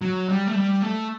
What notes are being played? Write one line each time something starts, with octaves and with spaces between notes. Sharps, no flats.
F#3
G3
A3
G3
A3